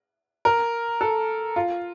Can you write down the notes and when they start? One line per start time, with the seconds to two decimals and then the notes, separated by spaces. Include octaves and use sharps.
0.45 A#4
1.01 A4
1.56 F4